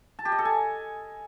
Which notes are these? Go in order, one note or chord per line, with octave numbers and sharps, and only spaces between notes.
A5
G4
D#5
A4
G#5